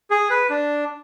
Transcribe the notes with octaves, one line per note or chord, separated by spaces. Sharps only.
G#4
B4
D4